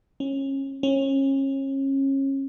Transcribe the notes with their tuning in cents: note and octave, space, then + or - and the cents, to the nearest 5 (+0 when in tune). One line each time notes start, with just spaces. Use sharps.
C#4 -25
C#4 -30